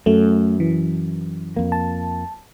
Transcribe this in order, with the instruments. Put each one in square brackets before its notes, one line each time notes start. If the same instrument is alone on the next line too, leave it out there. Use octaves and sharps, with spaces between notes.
[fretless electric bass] F#2 [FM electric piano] A3
[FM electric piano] E3
[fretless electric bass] F2 A#3
[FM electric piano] A5